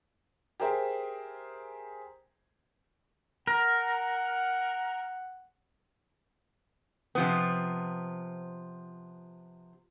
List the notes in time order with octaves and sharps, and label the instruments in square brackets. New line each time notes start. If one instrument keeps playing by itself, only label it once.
[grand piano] G4 G#4 A#4 C5 E5 G5
[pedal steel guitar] A#4 [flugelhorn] F#5
[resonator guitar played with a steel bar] C3 F3 B3